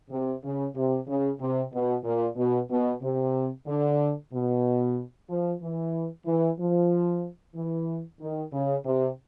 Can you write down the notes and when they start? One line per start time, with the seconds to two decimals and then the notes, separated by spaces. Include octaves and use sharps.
0.10 C3
0.43 C#3
0.75 C3
1.07 C#3
1.40 C3
1.73 B2
2.04 A#2
2.37 B2
2.70 B2
3.02 C3
3.66 D3
4.32 B2
5.29 F3
5.61 E3
6.26 E3
6.59 F3
7.55 E3
8.20 D#3
8.52 C#3
8.84 C3